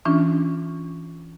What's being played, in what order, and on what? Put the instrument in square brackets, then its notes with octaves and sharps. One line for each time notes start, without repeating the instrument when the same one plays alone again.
[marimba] E3 C#4 D4 F4